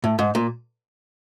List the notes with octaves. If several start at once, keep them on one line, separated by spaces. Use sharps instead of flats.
A2
G#2
A#2